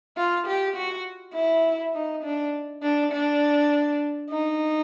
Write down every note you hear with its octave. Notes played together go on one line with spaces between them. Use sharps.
F4
G4
F#4
E4
D#4
D4
D4
D4
D#4